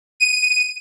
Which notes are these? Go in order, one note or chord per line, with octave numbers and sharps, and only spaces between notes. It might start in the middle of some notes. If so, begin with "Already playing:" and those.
D#7